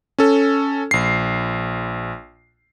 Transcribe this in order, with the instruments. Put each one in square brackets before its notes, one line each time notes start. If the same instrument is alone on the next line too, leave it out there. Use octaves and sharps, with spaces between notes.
[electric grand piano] C#4 A4
A#1 C7